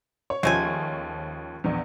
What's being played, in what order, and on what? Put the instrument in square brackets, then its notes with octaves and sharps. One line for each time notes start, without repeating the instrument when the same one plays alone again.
[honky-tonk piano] C#5
[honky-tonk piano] D#2 F3 C#4 [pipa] G#3 A3 G#5
[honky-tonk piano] A#1 E2